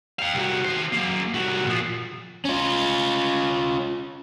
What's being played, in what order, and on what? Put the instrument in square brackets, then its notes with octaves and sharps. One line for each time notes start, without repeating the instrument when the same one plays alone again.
[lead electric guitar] F5 G5
C2 F#4
D#3 C5
F#3 A#3
C2 F#4
A#2 F3
[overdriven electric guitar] C#4 F4